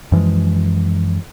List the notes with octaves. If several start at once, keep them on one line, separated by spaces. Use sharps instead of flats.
F#2 E3 F3 G#3